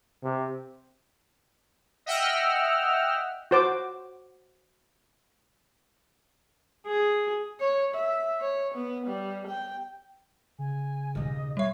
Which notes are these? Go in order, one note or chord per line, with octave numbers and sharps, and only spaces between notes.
C3
D#5 E5 F#5 G5 E6 F6
F#4 C5 D6
G#4
C#5
E5
C#5
B3
G3
G5
C#3 G#5
D#2 B2 D#5
G3 C#5 E5